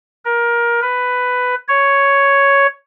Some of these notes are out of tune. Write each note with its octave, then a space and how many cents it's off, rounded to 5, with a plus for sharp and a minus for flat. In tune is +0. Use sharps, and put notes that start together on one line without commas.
A#4 +20
B4 +10
C#5 +5